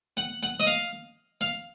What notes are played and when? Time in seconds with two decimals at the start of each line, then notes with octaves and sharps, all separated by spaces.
0.17 F#5
0.43 F#5
0.60 D#5
0.67 F5
1.41 F5